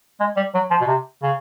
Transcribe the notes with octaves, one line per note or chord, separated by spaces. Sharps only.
G#3
G3
F#3
F3
B2
C3
C#3